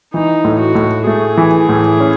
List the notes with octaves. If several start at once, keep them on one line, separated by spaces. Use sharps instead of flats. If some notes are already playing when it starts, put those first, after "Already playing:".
E3 D#4
A2
F#4
A2
A3 G#4
E3
A2
C#4